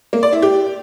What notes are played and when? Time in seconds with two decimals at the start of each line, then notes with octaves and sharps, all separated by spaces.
0.13 A#3
0.23 D5
0.33 E4
0.42 G4